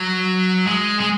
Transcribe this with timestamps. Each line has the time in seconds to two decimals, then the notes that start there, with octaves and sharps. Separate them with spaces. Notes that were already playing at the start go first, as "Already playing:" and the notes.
Already playing: F#3
0.67 G#3
1.00 G#3